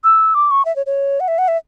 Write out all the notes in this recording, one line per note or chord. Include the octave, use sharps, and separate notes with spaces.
E6
D6
C#6
E5
C#5
C#5
F#5
E5
F#5
E5